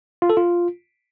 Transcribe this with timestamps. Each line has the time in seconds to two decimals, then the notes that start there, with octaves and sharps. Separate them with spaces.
0.22 F4
0.30 A4
0.37 F4